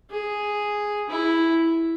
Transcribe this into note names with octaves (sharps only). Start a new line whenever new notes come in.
G#4
E4